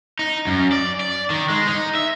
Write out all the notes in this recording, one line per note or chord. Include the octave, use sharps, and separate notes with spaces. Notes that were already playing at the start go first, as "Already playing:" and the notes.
D#4
F#2
D5
D5
D#3
G#3
D#4
E5